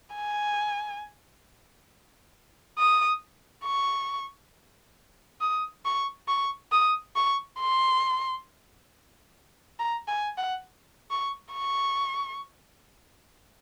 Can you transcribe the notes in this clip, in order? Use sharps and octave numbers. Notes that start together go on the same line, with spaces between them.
G#5
D#6
C#6
D#6
C#6
C#6
D#6
C#6
C6
A#5
G#5
F#5
C#6
C#6